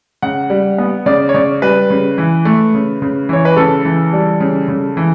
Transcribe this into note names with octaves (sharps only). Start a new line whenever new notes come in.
C#3 F#5
G3
B3
C#3 D5
C#5
C#3 D5
G3 B4
C#3
E3
A3
C#3
C#3
E3 C#5
B4
C#3 A4
E3
G3
C#3
C#3
E3